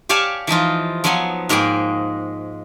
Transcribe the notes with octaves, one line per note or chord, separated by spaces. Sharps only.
G4 C#5 D5 F5 G#5 A5
E3 F3 D#4 F4
F3 F#3 B3 C#5 G#5 C6
G#2 G#3 A#3 G#4 G5